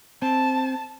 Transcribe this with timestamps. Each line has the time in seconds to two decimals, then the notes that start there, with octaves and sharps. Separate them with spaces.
0.22 C4 A5